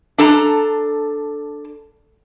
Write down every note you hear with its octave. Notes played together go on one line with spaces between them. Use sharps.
D4 A4 A#5